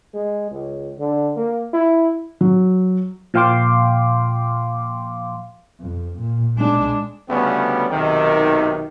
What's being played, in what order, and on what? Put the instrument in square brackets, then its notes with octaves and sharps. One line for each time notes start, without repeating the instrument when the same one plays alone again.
[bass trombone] G#3
C#2
D3
A#3
E4
[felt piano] F#3
[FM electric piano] A#2 F3 F5 G5 C6 D6
[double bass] F2
A#2
G#3 D4
[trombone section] D2 C#3 G3 B3 C#4
B1 C3 D#3